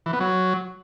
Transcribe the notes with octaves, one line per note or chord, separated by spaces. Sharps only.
E3
B3
F#3